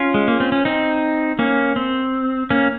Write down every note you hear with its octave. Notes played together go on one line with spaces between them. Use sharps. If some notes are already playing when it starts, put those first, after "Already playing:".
Already playing: C#4 F4
G#3
A#3
C4
C#4
C4 D#4
A#3 C#4
C4
A#3 C#4